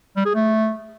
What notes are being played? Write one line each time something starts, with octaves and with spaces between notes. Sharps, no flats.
G3
G#4
A3